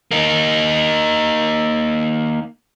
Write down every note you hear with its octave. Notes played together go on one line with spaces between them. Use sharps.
A#3 D#4